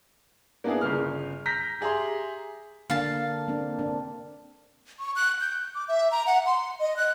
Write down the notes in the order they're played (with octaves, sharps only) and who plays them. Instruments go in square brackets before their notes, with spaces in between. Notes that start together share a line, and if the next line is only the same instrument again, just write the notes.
[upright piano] A#3 B3 D4 E4 G#4
G1 C#3 F6
A#5 G6 A#6 B6
G4 G#4 E5 A#5 C6
[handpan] D3 A#3 D4 [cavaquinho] F5 A5
[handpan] A#3 C4 D4
C4 D4
[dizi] C#6
F#6
G6
D6
E5
A#5
F#5
C6
D#5
F#6